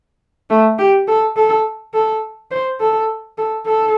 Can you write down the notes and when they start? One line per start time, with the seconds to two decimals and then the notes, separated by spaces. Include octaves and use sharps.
0.50 A3
0.79 G4
1.08 A4
1.36 A4
1.94 A4
2.51 C5
2.80 A4
3.38 A4
3.66 A4